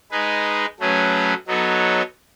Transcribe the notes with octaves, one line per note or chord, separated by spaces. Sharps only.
G#3 D#4 G#4 B4
F#3 A3 C#4 G#4 B4
F#3 B3 D#4 A4 C#5